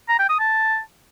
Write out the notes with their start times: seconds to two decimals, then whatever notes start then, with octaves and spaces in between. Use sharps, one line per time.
0.09 A#5
0.19 G5
0.29 D#6
0.39 A5